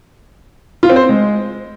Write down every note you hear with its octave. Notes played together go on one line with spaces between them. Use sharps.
F4
C4
C5
C4
G#3